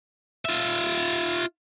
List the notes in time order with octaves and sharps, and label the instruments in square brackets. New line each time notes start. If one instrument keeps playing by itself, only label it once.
[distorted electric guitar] F4 E5